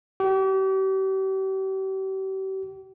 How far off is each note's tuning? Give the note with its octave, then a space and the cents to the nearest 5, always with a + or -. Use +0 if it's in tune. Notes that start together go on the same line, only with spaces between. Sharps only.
G4 -40